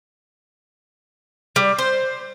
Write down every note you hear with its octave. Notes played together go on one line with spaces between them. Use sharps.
G3
C5